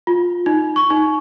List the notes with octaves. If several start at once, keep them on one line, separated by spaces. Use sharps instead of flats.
F4
D#4
C#6
D#4